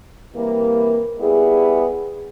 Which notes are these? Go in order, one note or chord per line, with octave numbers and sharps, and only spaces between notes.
C3 E3 G3 A#3
G3 B3 E4 G#4